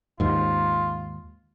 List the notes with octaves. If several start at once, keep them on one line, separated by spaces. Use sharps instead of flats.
D#2 G#2 F4